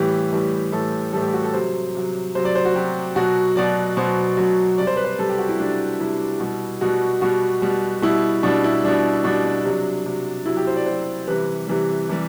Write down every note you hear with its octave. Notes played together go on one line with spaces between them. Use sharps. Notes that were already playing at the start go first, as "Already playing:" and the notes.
Already playing: A2 E3 G3 G4
A2 E3 G3
A2 E3 G3 A4
A2 E3 G3 A4
G4
F#4
A4
C3 F#3 C5
C3 F#3
C3 F#3 C5
D5
C5
F#4
C3 F#3 G4
B2 F#3 F#4
B2 F#3 D5
B2 F#3 C5
B2 F#3
C3 G3 D5
C5
B4
C5
C3 G3 A4
G4
F#4
E4
C3 G3 D4
C3 G3 E4
B2 G3
B2 G3 F#4
B2 G3 F#4
B2 G3
B2 G3 E4
B2 G3 D4
E4
B2 G3 D4
B2 G3 D4
D4
C3 F#3
C3 F#3
C3 F#3 E4
G4
C5
D5
C3 F#3 C5
C3 E3 G3 B4
C3 E3 G3
C3 E3 G3